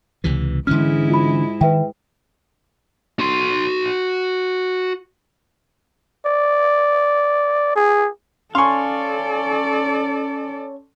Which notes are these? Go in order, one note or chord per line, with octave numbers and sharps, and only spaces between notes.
C#2 C3 E3
G#2 D3 E3 G#3 C#4 E4 F6
F4 B5
D#3 B4 E5 G5
F#4 C6
D5
G#4
C#4 A4 D5 F5 G#5 C6 C#6